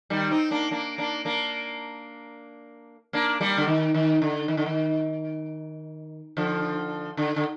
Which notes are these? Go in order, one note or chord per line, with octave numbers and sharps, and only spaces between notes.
D#3 G3
C4 D#4
A#3 D4
A#3 D4
A#3 D4
A#3 D4
A#3 D4
G3 A#3
D3
D#3
D#3
D3
D#3
D3
D#3
D3 F3
D3
D3